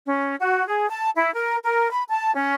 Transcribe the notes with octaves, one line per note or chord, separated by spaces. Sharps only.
C#4
F#4
G#4
A5
E4
A#4
A#4
B5
A5
C#4